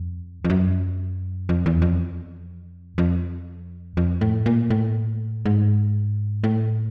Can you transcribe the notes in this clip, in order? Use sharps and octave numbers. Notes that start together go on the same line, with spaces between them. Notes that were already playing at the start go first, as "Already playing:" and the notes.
Already playing: F2
F2
F#2
F2
E2
F2
F2
F2
A2
A#2
A2
G#2
A2